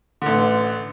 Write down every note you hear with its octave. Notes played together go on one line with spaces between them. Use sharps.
A1 D3